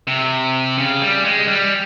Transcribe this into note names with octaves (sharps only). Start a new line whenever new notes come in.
C3
C#3
G3
G#3
G3